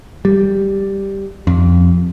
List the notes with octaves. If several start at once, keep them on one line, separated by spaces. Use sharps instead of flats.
G3
F2